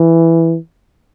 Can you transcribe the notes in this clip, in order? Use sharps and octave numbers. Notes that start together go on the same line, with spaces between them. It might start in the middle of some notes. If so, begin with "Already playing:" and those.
Already playing: E3